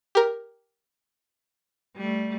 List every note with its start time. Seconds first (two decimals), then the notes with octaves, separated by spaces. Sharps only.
0.15 G4 A#4
1.96 G3 A3